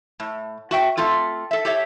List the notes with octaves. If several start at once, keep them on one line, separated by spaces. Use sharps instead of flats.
A2
F#4 E5 G5
A3 C4 F4 A4
A4 E5
G4 A4 C#5 E5